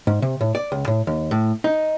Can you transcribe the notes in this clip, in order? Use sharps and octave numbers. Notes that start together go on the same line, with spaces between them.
G#2
C3
A2
D5
C#2
A2
D#2
A2
D#4